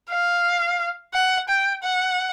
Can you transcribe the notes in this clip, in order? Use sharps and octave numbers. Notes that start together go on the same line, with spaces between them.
F5
F#5
G5
F#5